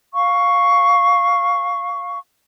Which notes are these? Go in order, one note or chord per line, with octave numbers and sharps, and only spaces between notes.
F5 C#6